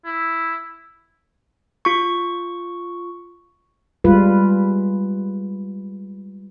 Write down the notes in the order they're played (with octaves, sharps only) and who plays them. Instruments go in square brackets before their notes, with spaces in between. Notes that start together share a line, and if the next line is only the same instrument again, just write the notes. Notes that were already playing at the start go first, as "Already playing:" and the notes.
[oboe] E4
[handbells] F4 C#6
[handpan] G3 G#3 F4 B4